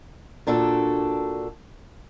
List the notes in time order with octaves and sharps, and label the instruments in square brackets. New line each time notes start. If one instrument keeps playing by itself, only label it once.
[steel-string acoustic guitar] A#2 D4 F#4 A4